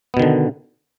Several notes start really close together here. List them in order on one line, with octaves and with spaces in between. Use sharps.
B3 B2 D#3 D3